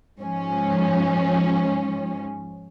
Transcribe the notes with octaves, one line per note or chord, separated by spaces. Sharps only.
G#2 F3 C#4